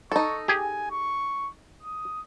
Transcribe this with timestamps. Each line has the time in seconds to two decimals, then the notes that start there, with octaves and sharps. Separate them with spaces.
0.12 D#4 A4 C#6
0.48 G4 G#4 G#5
0.91 C#6
1.83 D#6